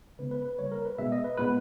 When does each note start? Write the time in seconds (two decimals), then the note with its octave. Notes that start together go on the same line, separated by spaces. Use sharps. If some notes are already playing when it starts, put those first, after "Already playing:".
0.19 C#3 G#3 B3 B4
0.31 B4
0.45 B4
0.58 C#3 G3 A#3 C#5
0.72 A#4
0.85 B4
0.98 B2 G#3 B3 E5
1.12 D#5
1.24 B4
1.37 A#2 G#3 B3 B4